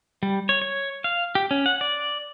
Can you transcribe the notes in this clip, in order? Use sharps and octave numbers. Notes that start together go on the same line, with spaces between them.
G3
C#5
C#5
F5
G4
C#4
F#5
D5